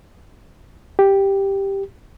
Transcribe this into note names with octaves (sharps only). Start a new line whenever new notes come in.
G4